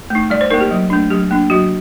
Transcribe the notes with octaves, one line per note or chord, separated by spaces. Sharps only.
A3 D#4
G3 D5
C5
A#3 D#4 A#4
G4
F#3
A3 D4
F#3 G4
A#3 D4
F#3 F#4